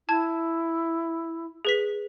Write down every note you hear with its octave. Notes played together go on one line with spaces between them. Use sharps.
E4 A5 G#6
G#4 B4 B6